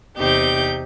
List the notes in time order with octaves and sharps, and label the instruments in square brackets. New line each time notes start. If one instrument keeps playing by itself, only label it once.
[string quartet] E2 C3 C4 D#4 G4 G6